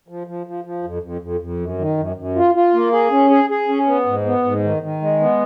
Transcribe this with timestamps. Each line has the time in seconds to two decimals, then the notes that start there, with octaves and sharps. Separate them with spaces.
0.08 F3
0.27 F3
0.47 F3
0.64 F3
0.83 F2
1.02 F2
1.21 F2
1.40 F2
1.60 F#2
1.78 D#3
1.97 F#2
2.16 F#2
2.36 F4
2.55 F4
2.74 A#3
2.92 G#4
3.11 C#4
3.30 G#4
3.50 G#4
3.68 C#4
3.87 B3
4.06 G#2
4.25 B3
4.44 G#2
4.63 D#3
4.83 D#3
5.01 G#3
5.20 B3